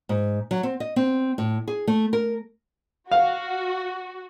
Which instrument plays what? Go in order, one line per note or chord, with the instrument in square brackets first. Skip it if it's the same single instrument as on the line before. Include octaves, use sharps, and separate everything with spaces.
[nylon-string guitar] G#2
F#3
C4
D#5
C4
A2
G#4
A3
A#4
[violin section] F#4 [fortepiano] F5